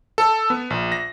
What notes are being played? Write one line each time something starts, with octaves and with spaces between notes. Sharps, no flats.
A4
B3
A#1
A#6